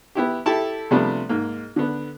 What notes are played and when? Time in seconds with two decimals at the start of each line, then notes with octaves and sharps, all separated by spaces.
0.15 B3 E4 G4
0.46 E4 G4 A4 A5
0.91 C3 F3 G3 A3 B3 D4
1.29 G#2 A#3
1.76 D3 B3